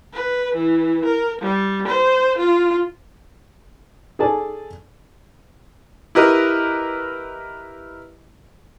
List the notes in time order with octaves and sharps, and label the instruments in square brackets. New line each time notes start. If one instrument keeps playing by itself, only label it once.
[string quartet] B4
E3
A#4
G3
C5
F4
[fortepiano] G#4 A4 D5 G#5 A5
E4 G4 A#4 B4 D#5